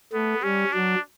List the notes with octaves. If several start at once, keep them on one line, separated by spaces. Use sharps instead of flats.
A3 B3
G3 C#4
F#3 D4